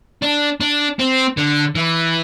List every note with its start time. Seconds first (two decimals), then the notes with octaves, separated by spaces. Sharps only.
0.22 D4
0.60 D4
0.99 C4
1.37 D3
1.75 E3